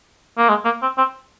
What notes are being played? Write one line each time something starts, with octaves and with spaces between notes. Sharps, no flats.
A#3
G#3
A#3
C4
C4